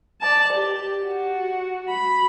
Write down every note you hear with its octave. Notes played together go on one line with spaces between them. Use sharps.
D5 A5
G4
F#4
B5